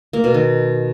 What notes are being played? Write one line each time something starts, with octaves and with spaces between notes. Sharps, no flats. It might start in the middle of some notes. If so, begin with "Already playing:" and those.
A#3
B2
D#3